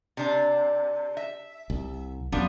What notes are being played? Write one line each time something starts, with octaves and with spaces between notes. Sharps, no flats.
C3 D4
E5
C2
C2 F#2 F3 B3 D4